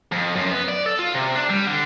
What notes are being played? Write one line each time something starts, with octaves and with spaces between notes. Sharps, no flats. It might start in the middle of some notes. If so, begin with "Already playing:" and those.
F2
F#2
B3
D5
A4
F4
C3
D4
G3
D3